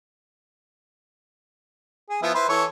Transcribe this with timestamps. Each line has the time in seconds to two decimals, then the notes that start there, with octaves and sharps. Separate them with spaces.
2.10 G#4
2.22 F3 B3 E4
2.34 E4 B4 C5
2.49 E3 A4 C#5